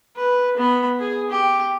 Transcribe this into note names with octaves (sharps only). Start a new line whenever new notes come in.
B4
B3 B5
G#4
G4